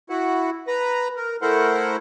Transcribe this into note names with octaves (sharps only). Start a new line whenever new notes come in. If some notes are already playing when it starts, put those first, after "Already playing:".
E4 F#4 F#5
B4 A#5
A#4
A3 E4 A#4 C5 F#5